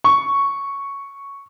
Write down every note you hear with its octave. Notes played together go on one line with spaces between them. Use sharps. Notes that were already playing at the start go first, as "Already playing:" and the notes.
C#6